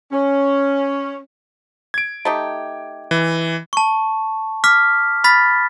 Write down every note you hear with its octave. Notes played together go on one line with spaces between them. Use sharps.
C#4
G#6 D7
A3 D#4 G4
E3
A5 C#6
D6 F6 B6
B5 F6 A6 B6